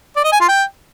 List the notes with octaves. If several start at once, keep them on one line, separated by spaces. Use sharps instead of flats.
D5
D#5
G#5
F4
G5